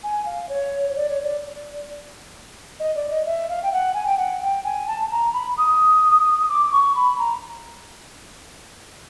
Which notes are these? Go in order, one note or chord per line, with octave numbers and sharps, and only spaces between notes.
G#5
F5
C#5
D5
C#5
D5
D#5
D5
D#5
E5
F5
G5
F#5
G#5
G5
F#5
G5
G#5
A5
A5
A#5
B5
D#6
D#6
D6
D6
C#6
B5
A#5